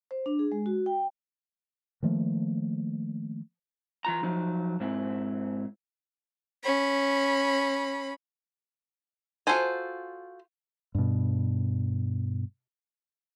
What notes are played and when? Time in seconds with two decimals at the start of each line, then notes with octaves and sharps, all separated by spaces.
0.11 C5
0.26 D4
0.39 G#4
0.52 G#3
0.66 F#4
0.86 G5
2.03 D#3 F3 A3 A#3
4.05 E3 F4 A#5
4.23 F3 F#3 D#4
4.80 G#2 C4 E4
6.63 C#4 B5
9.47 F4 F#4 A4 C5 G#5
10.95 G2 B2